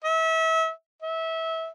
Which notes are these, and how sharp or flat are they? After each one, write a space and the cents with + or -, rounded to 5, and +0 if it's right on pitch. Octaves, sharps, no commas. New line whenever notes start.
E5 -30
E5 -25